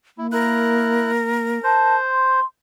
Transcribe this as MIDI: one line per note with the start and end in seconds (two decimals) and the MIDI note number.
0.18 1.59 58
0.18 0.27 64
0.32 1.11 64
0.32 1.98 70
0.32 1.11 90
1.64 2.40 72
1.64 1.96 81
2.10 2.45 84